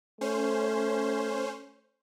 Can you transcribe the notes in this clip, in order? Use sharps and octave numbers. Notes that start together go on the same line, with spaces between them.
A3 C#4 C5